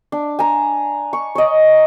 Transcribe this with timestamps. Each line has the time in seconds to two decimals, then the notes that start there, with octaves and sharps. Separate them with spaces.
0.12 D4
0.39 G#5 A#5
1.13 C#6
1.35 C#5 D#5